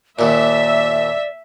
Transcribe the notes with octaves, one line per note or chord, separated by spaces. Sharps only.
D#2 A#2 D5 E5